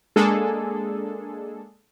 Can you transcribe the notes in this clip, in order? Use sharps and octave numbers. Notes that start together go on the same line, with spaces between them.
G#3 A#3 D4 G#4 A4